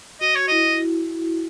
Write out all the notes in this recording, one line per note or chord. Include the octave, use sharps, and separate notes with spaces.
F#4 D#5
C#5
E4 D#5